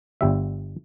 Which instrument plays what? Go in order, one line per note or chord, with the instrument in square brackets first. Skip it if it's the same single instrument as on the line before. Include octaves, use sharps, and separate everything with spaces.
[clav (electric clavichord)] G1 G3 E5